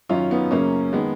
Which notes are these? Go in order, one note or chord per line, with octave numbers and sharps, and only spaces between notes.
F#2 D#3 C#4 F4
B3 D#4
F#2 C#3 A#3 C#4
D#3 G#3 B3